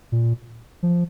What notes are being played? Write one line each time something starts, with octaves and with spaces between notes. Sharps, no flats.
A#2
F3